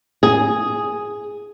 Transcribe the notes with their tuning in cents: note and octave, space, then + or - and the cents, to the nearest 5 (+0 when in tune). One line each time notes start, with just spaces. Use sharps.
G#4 +0